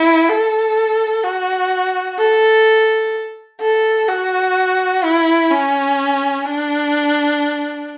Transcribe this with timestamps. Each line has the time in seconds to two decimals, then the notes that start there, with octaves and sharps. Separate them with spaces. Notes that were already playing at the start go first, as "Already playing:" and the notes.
Already playing: E4
0.29 A4
1.24 F#4
2.18 A4
3.61 A4
4.08 F#4
5.03 E4
5.50 C#4
6.45 D4